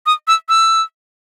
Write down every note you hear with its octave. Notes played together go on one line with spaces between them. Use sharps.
D#6
E6
E6